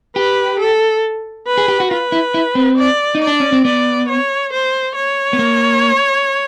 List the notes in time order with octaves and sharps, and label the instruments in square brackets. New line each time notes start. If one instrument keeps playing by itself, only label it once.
[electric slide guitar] G4 [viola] B4
[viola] A4
B4
[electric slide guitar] G#4
G4
F#4
[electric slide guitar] F4 [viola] B4
[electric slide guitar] E4
E4
C4
[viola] D5
[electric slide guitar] D#4
[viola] D5
[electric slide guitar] D4
C#4
C4
[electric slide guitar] B3 [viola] D5
[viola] C#5
C5
C#5
[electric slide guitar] B3
A#3